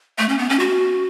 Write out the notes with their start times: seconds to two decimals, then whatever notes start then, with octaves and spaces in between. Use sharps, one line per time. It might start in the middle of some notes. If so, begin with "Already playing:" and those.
0.18 A3
0.29 C#4
0.38 B3
0.49 C#4
0.59 F#4